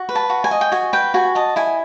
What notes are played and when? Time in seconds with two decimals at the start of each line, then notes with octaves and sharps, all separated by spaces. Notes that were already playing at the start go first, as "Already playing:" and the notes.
Already playing: F#4
0.09 B4
0.15 A5
0.30 F#4
0.44 G#5
0.51 D#5
0.61 G5
0.72 F#4 G#5
0.93 B4 G5
1.14 F#4 G#5
1.35 D#5 A5
1.56 E4 G#5